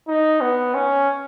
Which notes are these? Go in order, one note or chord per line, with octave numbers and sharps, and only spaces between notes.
D#4
B3
C#4